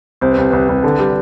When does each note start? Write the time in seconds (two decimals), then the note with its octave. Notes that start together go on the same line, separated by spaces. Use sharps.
0.21 C2 C5
0.32 B4
0.38 C2
0.51 C2 B4
0.69 C2
0.84 D3
0.99 G3